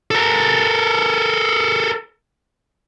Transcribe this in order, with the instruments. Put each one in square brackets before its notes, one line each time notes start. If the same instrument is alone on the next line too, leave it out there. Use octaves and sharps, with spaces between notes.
[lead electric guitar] A4 A#4